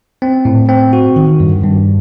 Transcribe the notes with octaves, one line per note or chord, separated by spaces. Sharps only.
C4
A2
C4
F#4
D#3
G2
G2